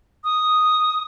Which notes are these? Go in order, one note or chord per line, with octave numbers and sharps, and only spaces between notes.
D#6